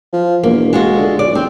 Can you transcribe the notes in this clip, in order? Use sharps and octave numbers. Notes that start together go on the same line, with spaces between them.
F3
E1 A#3
G#3 F4 F#4
D3
B1 D5
E1 C4